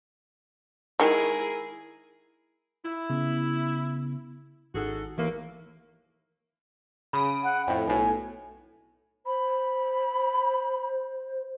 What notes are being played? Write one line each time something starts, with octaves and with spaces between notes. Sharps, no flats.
D#3 G#3 E4 G#4 A#4
E4
C#3 B3
G#1 D#4 F#4 G#4 A4 F#5
D#2 E3 A3 A#3
C#3 B5 D#6 D7
F#5
F2 A2 G5
B1 A2 G#5
C5 B5